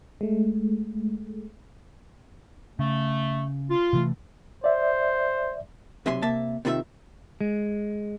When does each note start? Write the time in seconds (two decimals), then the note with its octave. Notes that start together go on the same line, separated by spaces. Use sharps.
0.21 G#3 A3
2.79 C#3 A3
3.70 F4
3.93 C3 E3 A3
4.64 C5 D5 E5
6.06 B1 C3 F#3 E5 G#5 C6
6.22 C3 A#3 E5 A5
6.65 C3 D#3 F4 A4 E5
7.41 G#3